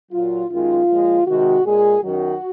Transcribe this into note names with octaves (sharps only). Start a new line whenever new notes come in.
A#2 F#3 F4
F#2 D#3 G#3 F4
A#2 F3 G#3
C3 D#3 G#3 F#4
A#2 G#3 G#4
F#2 D#3 F#3 F#4